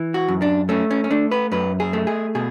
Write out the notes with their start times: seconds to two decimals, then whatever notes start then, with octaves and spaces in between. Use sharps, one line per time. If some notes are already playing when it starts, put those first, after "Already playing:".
Already playing: E3
0.14 F#4
0.28 F#2
0.42 D4
0.69 A3 C#4
0.91 C#4
1.04 C#4
1.11 A3 D4
1.32 B4
1.52 F#2 B4
1.80 G#4
1.93 A3
2.07 G#4
2.35 B2 G#4